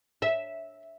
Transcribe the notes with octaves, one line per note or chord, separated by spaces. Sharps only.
E5